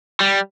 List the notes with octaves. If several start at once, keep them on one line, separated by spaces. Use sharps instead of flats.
G3